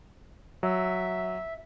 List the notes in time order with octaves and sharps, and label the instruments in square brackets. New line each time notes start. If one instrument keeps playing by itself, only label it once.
[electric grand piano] F#3 [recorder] E5